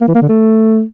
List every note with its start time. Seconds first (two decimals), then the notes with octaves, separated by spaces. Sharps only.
0.01 A#3
0.08 E3
0.15 A#3
0.22 D3
0.29 A3